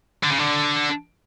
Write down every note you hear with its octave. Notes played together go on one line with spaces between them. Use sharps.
D3
C#3
D3